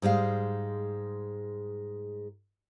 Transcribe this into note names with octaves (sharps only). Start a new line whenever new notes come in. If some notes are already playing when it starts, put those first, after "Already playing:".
G#2 G3 G#3 F5